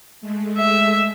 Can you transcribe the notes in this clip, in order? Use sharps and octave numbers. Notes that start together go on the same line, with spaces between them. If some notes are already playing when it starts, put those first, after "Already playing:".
G#3 A3
E5